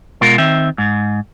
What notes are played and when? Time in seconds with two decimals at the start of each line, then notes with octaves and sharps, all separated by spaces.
0.21 B2 G#3 F4 A#4
0.38 D#3 C4 E5
0.78 G#2